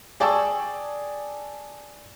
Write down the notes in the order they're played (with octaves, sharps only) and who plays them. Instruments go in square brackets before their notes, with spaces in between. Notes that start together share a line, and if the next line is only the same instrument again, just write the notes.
[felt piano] G#4 D5 G5 A5 C#6 E6